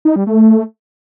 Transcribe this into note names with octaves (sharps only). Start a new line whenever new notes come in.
D#4
G3
A3